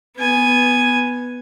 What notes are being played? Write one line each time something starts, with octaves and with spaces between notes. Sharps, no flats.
B3 G#5